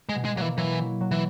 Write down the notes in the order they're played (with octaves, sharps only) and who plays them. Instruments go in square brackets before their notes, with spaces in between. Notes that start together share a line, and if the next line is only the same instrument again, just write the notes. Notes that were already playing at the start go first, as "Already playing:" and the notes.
[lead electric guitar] G#3
[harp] B2
[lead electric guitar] G#3
[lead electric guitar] F#3 [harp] A#3
[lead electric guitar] E3
[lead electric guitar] E3 [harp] F#3
[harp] E4
F#3
[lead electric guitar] E3